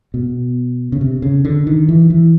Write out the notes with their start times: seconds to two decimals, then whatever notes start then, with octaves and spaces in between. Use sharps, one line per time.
0.14 B2
0.92 C#3
1.01 C3
1.22 C#3
1.45 D3
1.67 D#3
1.88 E3
2.10 E3